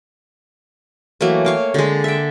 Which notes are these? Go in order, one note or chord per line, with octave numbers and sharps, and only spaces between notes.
E3 F#3 A3 A#3
C#5 F5 G5
D3 G#3
E5 G5